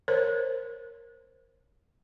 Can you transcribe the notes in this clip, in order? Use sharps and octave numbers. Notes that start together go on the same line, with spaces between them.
A#4 C5 C#5